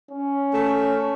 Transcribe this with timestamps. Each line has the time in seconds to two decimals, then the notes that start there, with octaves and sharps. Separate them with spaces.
0.11 C#4
0.54 A3